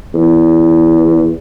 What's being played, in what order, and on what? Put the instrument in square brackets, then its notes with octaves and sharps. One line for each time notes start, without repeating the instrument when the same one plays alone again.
[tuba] E2